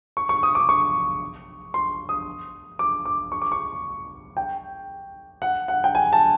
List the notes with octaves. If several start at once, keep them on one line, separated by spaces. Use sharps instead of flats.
C#6
C#6
D#6
D6
C#6
C6
D#6
D6
D6
C#6
D6
C#6
G5
F#5
F#5
G5
G#5
A5